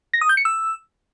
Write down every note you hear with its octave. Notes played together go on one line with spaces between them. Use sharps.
A#6
D#6
G6
C#7
E6